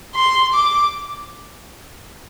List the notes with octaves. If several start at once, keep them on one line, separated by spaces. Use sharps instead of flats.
C6
D6